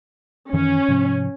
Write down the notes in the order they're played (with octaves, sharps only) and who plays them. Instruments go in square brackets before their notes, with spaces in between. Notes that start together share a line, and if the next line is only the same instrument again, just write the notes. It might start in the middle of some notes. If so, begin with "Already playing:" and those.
[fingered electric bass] F#2 D#3 E3 [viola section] C#4
[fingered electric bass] G#2 C3 F3